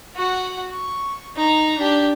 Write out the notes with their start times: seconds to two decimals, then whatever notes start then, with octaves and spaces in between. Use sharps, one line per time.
0.16 F#4 F#5
0.71 C#6
1.36 D#4 A#5
1.78 D4 G4